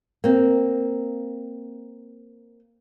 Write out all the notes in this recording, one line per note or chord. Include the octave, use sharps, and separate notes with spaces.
A#3 C4